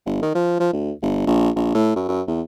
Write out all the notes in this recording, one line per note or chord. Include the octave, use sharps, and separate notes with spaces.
G1
D#3
F3
F3
D2
G1
A#1
A#1
A2
F#2
F#2
E2